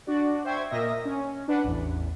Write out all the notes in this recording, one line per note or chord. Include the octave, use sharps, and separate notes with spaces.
D4 F#4 D5
C5 E5 G5 C#6 G#6
A#2 A#3 A#4 D#5 E5 A#6
C#4
D4 B4 F#5
A1 E2